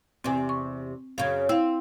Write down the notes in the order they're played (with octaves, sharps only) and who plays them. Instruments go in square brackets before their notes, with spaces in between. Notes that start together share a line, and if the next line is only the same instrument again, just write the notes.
[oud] E2 C3 [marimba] C4 G#5
[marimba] C#6
[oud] F#2 C#3 [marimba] F5 G#6
[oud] C4 [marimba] E4 F5